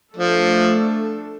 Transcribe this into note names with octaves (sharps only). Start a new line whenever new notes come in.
F3 A3 D4 A4